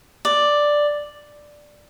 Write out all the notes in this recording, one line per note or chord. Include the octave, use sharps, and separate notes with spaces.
D5